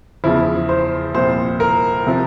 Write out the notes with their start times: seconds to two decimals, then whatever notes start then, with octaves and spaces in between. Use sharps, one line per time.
0.24 E2 C#3 F3 E4
0.69 C5
1.14 C2 A#2 F3 C5
1.60 A#4
2.07 C3 F3